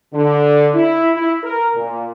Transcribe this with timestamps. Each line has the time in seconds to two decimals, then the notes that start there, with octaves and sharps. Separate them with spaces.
0.14 D3
0.75 E4
1.15 E4
1.44 A#4
1.76 A#2